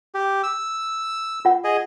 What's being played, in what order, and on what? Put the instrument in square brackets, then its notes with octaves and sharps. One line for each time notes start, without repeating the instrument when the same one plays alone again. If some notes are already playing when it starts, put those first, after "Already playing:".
[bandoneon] G4
E6
[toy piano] F4 F#5
[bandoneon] G#4 D#5